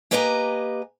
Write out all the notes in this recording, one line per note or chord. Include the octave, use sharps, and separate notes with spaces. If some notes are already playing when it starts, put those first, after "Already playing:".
A#3 G4 B4 D#5 G#5 A#5